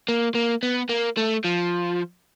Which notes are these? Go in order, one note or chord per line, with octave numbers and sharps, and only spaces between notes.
A#3
A#3
B3
A#3
A3
F3